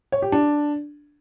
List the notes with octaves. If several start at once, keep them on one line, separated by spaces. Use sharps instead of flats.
C#5
G4
D4